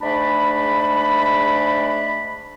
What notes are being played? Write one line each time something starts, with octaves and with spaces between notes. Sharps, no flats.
G#2 G#3 A3 D4 D5 B5